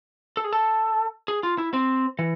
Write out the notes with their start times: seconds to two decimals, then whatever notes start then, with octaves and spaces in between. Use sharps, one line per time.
0.37 A4
0.44 G#4
0.53 A4
1.28 G#4
1.43 F4
1.58 E4
1.73 C4
2.19 E3